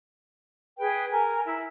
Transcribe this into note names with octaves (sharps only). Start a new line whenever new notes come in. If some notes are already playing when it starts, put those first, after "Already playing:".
G#4 B4 G5
A#4 G#5
E4 E5